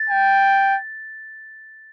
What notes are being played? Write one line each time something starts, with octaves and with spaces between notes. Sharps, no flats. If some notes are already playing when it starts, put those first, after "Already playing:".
Already playing: A6
G5